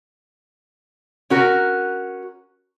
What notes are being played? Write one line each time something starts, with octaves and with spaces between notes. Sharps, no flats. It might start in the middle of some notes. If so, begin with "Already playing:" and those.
C#4 F#4 A#4